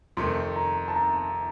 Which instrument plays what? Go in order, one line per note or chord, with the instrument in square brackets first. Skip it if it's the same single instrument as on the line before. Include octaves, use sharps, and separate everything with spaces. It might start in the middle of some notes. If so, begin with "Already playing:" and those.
[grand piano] F2 C3 D#3 A3 [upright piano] C6
[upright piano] A#5
A5
A#5